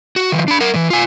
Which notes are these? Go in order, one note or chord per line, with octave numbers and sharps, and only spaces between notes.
F#4
D#3 F3
D4 B5
A#4 F#5
A2 E3
F4 G#5